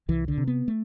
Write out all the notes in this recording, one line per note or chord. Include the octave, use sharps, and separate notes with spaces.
C2 E3
D3
C3
B3
A3